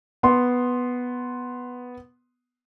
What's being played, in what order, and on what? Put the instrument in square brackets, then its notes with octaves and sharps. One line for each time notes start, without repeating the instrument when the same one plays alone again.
[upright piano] B3 C6